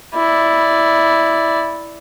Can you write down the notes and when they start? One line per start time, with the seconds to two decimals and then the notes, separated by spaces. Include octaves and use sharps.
0.15 E4 D5